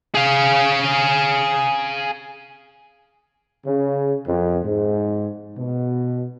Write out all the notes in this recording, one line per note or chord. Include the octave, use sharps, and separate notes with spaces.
G#4 F5
C#3
F2
G#2
B2